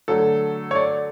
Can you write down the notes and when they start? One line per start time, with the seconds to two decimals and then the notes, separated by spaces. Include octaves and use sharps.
0.08 D3 F#3 A3 A4
0.71 C#5
0.75 D5